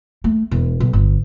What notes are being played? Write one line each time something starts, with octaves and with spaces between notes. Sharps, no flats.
A3
E1
B1
G1